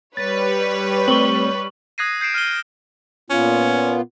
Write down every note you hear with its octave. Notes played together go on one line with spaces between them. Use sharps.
G3 B4 C#5 A6
A3 C4 C#6 F#7
D#6 F#6 G#6 A#6 C7 D#7
G6 C7 D7 E7
F6 D#7 G7
A#2 B3 C#4 F4